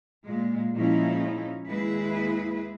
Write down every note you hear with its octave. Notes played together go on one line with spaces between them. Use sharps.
A#2 G#3
A#2 F3 G#3 C#4 D#4 E4
D#2 G#3 E4 G#4 B4